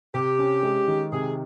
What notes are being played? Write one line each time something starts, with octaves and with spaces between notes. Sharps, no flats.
C3 G4
C#4
G#3
D#3
C3 G#4